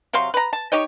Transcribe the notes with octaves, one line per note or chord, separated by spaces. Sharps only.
C3 F#3 F5 C6
B4 A#5
A5
D#4 G4 C#5 D#5